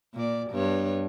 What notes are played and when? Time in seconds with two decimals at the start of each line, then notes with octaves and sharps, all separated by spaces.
0.14 A#2 D5
0.51 G2 B3 C#5